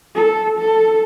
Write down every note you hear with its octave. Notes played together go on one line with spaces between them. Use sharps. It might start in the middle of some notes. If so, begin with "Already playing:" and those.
A4
A4